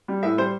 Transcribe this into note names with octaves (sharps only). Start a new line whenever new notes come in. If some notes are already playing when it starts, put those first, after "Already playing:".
G3
A2 E5
G3 C5